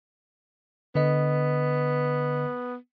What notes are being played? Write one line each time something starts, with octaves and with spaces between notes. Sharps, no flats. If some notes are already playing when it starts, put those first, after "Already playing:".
D3 B3 D#5